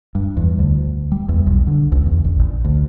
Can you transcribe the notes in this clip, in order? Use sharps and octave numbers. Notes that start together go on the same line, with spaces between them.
G2
E2
D2
G3
E2
B1
D3
C#2
E2
A#1
A#1
D2